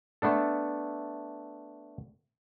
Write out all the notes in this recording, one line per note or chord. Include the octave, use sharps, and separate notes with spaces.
A3 B3 D4 A4